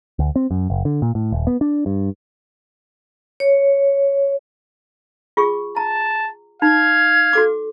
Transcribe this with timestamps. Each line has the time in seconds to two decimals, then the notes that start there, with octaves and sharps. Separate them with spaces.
0.19 D2
0.36 C4
0.51 F#2
0.70 F#1
0.85 D3
1.02 A#2
1.15 A2
1.32 D#1
1.47 B3
1.61 D4
1.86 G2
3.40 C#5
5.37 F4 G#4 C#6
5.76 A5 A#5
6.62 D#4 F5 G#6
7.33 F#4 A4 D6